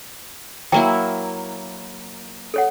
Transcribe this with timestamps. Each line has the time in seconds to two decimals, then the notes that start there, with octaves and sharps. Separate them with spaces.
0.72 F#3 A#3 E4 G5
2.54 A4 C#5 F#5